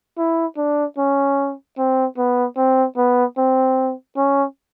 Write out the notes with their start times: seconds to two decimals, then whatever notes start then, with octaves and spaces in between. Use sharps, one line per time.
0.18 E4
0.57 D4
0.98 C#4
1.78 C4
2.18 B3
2.57 C4
2.97 B3
3.38 C4
4.17 C#4